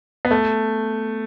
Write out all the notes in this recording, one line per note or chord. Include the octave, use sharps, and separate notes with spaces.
B3
A3